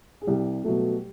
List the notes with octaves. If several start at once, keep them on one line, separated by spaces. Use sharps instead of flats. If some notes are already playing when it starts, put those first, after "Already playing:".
G#4
C2 G3 G4
B2 F#3 A3